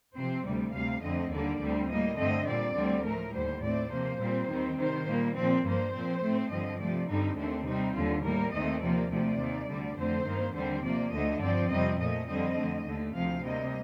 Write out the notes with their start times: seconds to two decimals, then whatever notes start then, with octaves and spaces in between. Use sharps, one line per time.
0.15 C3 F3 C4 C5
0.43 D2 C3 G3 D5
0.73 D2 C3 G3 F5
1.01 F2 D3 A3 C4 D#5
1.30 D#2 D3 G3 A#3 D5
1.59 D2 D3 G3 C4
1.88 A2 G3 A#3 D#5
2.17 G2 D3 A3 C4 D#5
2.46 A#2 G3 C4 D5
2.75 D2 D3 G3 C4
3.03 A2 F3 A3 A#4
3.33 D#2 D3 G3 C5
3.61 A2 A3 C4 D5
3.90 C3 F3 A#3 C5
4.19 A#2 G3 C4
4.49 D#2 D#3 G3 C4
4.78 C3 D#3 G3 C5
5.07 A#2 G3 A#3
5.36 A#2 F3 C4
5.64 G2 F3 A#3 C5
5.93 A#2 F3 C4
6.22 A2 A3 C4
6.50 G2 D3 F3 C4 D#5
6.80 C3 F3 A3 D5
7.08 G2 D3 G3 C4 D#4
7.37 D#2 D3 A3 C4 D4
7.66 C3 G3 C4 D#4
7.95 D#2 D3 G3 F4
8.24 A2 G3 A#3 A#4
8.53 D#2 D#3 A3 C4 D#5
8.81 C3 F3 A#3 D5
9.10 D2 C3 F3 A3 D5
9.39 D#2 D#3 A#3
9.68 D2 D3 G3
9.97 F2 D3 A3 C4 C5
10.26 G2 D#3 A#3
10.54 D#2 D3 G3 C4 C5
10.83 C3 F3 A#3 D5
11.12 D2 D3 A3 D#5
11.41 G2 F3 C4 D5
11.70 F2 C3 G3 C4 D#5
12.00 A#2 F3 A3 D#5
12.29 F2 D3 G3 C4 D#5
12.56 F2 D3 A3
12.85 D#2 D3 A3
13.14 D2 C3 F3 F5
13.44 C3 G3 A#3 D#5